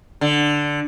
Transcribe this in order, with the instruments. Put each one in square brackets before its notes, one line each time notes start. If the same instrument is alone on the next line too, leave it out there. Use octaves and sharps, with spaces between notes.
[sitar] D3